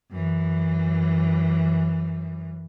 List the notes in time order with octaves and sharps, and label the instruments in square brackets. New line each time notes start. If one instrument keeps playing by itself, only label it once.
[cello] F#2 E3